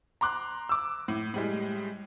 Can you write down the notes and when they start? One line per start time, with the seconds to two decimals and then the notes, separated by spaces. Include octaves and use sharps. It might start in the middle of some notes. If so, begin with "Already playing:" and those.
0.21 A#5 C6 D6 F#6
0.69 D6 E6
1.08 A2
1.34 A2 G3 G#3